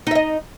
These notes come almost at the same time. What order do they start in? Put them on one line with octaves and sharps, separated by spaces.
D#4 E5 D#5